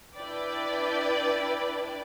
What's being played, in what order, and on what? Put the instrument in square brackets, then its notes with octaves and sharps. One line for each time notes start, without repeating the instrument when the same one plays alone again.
[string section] D4 E4 B4 D5 G5